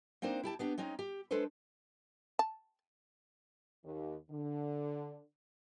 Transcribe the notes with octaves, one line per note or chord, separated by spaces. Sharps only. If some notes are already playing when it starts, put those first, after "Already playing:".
A#3 C4 D4 D#4 C5
E4 G4 A5
B3 D4 G4
G#3 C4 C#4 D#4
G4
G#3 D4 A4 B4 C5
A5
D#2
D3